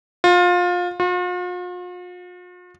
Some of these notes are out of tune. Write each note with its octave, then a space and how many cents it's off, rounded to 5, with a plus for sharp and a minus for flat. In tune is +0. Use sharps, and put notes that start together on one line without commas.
F4 +25
F4 +45